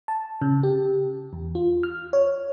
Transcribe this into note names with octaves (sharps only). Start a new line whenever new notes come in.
A5
C#3
G4
E2
F4
F6
C#5